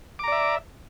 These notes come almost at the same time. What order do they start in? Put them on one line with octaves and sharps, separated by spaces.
D6 A#5 D5 E5